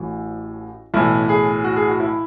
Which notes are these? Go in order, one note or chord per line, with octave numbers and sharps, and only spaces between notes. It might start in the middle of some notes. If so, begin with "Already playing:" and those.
Already playing: A1 A2 E3 F#4
B1 A2 E3 E4
G#4
F#4
G#4
F#4
E4